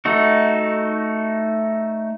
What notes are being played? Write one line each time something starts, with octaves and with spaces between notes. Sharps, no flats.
A3 D#4 F#4